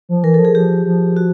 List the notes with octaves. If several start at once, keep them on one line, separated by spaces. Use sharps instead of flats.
F3
E3 A#4
A4
F3
G#4
F3 G4
F3
F#4